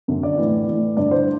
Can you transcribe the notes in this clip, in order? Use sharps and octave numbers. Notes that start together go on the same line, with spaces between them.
F#2 D3
D5
A2 E3
A2 E3
G2 D3 D5
C5